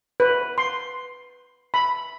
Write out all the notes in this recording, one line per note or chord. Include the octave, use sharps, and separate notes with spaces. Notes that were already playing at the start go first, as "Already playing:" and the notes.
B4
C6
B5